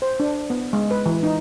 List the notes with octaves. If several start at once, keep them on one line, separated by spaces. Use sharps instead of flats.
C5
D4
B3
G#3
B4
E3
D#4